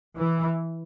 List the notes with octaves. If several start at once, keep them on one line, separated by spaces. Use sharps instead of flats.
E3